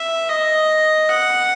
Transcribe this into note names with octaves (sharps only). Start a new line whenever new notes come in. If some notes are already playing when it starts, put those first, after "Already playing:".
Already playing: E5
D#5
F#5